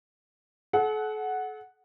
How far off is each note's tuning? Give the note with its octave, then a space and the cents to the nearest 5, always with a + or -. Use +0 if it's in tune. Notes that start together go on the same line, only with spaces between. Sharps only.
A4 -40 F#5 +0